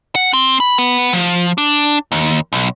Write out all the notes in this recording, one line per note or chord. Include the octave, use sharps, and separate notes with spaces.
F#5
C4
B5
B3
F3
D4
D#2
B1